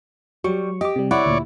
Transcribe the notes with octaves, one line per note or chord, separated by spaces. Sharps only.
F#3 G3 C#6
G4 D#5 D6
C3 G3
E4 C#5 D5 F#5
D2 A#2